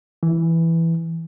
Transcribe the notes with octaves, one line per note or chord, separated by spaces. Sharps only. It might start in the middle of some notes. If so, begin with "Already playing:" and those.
E3